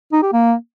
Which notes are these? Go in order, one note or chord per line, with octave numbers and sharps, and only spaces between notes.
D#4
G4
A#3